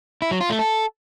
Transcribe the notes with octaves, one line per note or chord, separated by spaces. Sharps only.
E4
F#3
F4
A3
A4